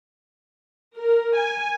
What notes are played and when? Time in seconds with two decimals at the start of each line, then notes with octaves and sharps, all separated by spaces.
0.95 A#4
1.35 G#5